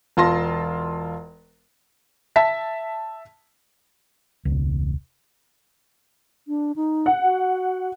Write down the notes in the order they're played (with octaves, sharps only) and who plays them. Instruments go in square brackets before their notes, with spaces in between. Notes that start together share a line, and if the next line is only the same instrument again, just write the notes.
[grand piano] E1 F4 A5 C6 A#6
[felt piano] E5 A5 B6
[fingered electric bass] E1 C#2
[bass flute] D4
D#4
[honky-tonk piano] F#5
[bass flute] F#4